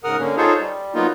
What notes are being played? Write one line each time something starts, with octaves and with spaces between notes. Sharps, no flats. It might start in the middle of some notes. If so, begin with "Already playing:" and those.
G#2 C#3 A#4 F#5 D#6 F6
D3 A#3 C#4
D#4 F4 G#4 A4 C5 C#5
G3
F#3 A#3 B3 D#4 F4